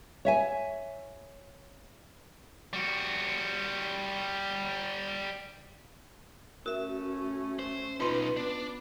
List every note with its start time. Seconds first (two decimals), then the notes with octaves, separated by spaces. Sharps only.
0.25 C#5 E5 G#5
2.73 G3 F#4
6.66 A3 C#4 F#4 A#4 E5
7.59 C5
8.00 B2 D#4 F4 B4 C6
8.37 B3 D4